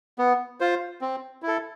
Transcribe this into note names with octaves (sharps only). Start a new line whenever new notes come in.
B3
F4 C5
C4
E4
A4